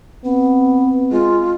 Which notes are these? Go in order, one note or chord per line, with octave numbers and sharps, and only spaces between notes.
B3 C4
G#3 F4